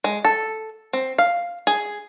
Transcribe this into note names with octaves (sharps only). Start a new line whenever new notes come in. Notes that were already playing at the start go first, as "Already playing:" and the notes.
G#3
A4
C4
F5
G#4